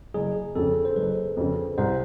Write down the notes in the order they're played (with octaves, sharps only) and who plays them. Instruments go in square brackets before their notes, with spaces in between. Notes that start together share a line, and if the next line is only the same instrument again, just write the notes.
[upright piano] F#1 [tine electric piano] G#4
[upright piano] F2 C#3 [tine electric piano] A4
[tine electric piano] C5
[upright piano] F#1 [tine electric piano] B4
[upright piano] F2 C#3
[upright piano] C2 [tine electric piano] C5